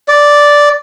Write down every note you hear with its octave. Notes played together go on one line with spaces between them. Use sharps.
D5